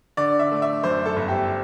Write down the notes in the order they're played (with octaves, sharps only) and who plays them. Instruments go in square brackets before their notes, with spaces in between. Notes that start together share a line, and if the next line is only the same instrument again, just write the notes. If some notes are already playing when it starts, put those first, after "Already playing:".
[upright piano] D3 D5
E5
A3
E5
F#2 C5
A4
G1
G4